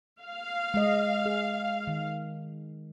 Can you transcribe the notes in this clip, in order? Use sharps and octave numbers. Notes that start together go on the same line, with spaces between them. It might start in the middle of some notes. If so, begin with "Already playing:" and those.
F5
G#3 D#5
G#4
D#3